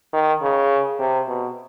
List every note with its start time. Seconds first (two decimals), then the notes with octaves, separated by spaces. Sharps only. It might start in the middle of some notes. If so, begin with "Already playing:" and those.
0.13 D#3
0.42 C#3
1.00 C3
1.28 B2